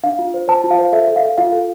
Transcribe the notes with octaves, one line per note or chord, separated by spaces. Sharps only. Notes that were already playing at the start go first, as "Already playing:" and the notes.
D4 F5
F4
C5
C5 A5
F4
F5
C5
A4 E5
A4
F5
A4
F4 F5
A4